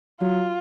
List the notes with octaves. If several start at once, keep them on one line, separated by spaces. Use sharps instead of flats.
F#3 F4